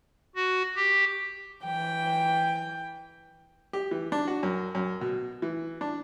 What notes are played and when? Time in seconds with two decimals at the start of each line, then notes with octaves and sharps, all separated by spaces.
0.35 F#4
0.76 G4
1.64 E3 G5
3.73 G4
3.91 E3
4.12 D4
4.28 F#4
4.43 F#2
4.75 F#2
5.01 B2
5.42 E3
5.81 D4